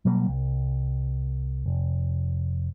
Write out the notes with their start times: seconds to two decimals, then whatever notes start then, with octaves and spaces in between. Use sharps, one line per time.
0.05 B2 F#3 G3 A#3
0.28 C2
1.66 F1